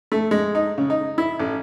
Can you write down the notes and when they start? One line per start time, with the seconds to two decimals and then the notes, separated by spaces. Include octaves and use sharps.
0.12 A3
0.31 G#3
0.55 D#4
0.78 C#3
0.90 D#4
1.18 E4
1.39 A1